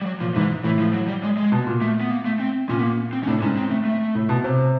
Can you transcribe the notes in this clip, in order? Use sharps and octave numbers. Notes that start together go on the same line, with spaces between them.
G3
F#3
A#2 F3
G#2 E3
A2 E3
F3
F#3
G3
G#3
G#3
B2
A#2
A3
B3
A#3
A3
C4
A#2 C#4
B3
A#3
C4
C#4
A2 D4
G#2 C#4
C4
A3
A3
A2
B2
C3